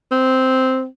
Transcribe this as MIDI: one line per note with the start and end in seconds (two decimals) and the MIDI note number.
0.11 0.85 60